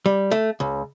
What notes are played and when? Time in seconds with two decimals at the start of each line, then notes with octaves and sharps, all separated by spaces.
0.06 G3
0.31 A3
0.60 C#2